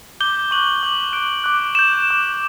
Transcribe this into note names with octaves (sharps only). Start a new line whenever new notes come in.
D6 G6 G7
C#6 F#6 F#7
D6 G6
C#6 F#6 D7
D6 F#6
D6 G6 E7
D6 G6